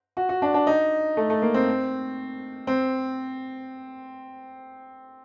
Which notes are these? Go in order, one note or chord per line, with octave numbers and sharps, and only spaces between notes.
F#4
F#4
D4
D4
D#4
A3
A3
A#3
C4
C4